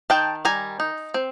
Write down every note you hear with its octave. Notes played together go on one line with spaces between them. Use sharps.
D#3 G5 A5
G3 G#5 A#5
D#4
C4